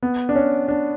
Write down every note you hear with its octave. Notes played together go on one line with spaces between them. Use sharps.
B3
D4
C#4
D4